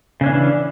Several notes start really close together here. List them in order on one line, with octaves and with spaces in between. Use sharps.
C#3 C#4 D4 E3